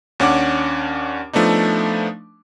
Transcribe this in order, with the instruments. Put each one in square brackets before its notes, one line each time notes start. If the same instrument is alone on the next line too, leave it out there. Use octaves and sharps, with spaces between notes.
[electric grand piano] D#2 C#4 D4 F#5 D6
F3 A3 B3 D4 D#4